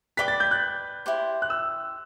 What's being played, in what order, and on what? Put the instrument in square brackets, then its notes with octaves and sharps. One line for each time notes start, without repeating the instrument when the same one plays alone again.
[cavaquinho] B4 D5 G5 D6 [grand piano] B6
[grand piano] A6
G6
F#6
[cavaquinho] E4 G4 C5
[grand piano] F#6
E6